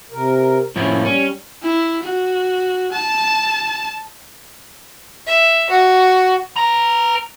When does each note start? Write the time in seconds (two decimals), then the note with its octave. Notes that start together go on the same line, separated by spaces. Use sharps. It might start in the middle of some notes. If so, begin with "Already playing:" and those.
0.11 C3 A#4
0.76 A2 F3 A#3 C#4 E4
1.05 G3 C#4
1.62 E4
2.03 F#4
2.91 A5
5.27 E5
5.69 F#4
6.56 B4 A#5